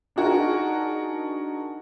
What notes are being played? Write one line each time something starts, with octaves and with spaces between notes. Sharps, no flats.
D4 D#4 F#4 G#4 A#4